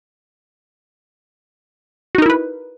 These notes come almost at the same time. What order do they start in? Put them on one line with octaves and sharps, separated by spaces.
F#4 D#4 A#4 E4 B4